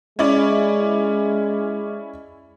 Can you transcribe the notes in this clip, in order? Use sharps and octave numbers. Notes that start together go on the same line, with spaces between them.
G#3 C#4 E4 D5